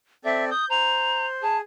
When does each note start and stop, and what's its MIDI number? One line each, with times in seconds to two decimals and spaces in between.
0.25 0.50 60
0.25 0.50 69
0.25 0.50 74
0.25 0.45 76
0.51 0.65 87
0.51 0.67 91
0.70 1.42 72
0.70 1.26 82
1.43 1.61 68
1.43 1.57 81